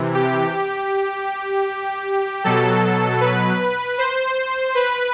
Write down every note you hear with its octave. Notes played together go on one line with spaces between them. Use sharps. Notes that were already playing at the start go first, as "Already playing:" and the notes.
Already playing: C3 E3
G4
B2 F#3 A4
B4
C5
B4